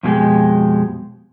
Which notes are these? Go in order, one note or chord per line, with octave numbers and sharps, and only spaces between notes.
F2 B2 F3 G#3 G4